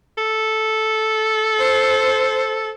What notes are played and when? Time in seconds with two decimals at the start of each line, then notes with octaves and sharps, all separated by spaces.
0.18 A4
1.58 C5